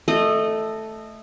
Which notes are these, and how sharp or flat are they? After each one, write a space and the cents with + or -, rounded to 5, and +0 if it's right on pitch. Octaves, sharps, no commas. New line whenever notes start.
A3 +0 D#5 -20